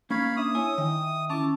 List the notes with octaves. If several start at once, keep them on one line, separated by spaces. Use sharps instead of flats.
A#3 C#4 C#5 F5 B5 C#6
D4 E5 D#6
E4 C#5 G#5
D#3 E5 G5
C#4 E4 A5 D6